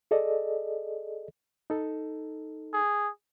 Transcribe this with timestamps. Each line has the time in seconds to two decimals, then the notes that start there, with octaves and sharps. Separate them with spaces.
0.11 G#4 A4 D5 D#5
1.70 D#4 A4
2.74 G#4